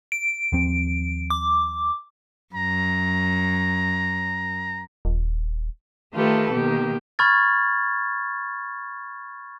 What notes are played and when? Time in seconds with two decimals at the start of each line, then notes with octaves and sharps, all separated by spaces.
0.12 D7
0.52 D#2 F3 C4
1.30 D6
2.54 F#2 A#5
5.05 D#1
6.13 D#3 A3 F4 G4 A4 B4
6.53 B2 D#3 A#3 G4
7.19 B5 C#6 F6 G#6 A6